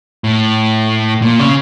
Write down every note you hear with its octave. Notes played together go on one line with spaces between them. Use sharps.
A2
A#2
C#3